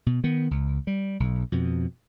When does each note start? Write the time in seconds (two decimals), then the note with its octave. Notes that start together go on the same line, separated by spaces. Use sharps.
0.06 B2
0.24 D#3 B3
0.51 C#2
0.87 G3
1.20 B1
1.52 F2 B2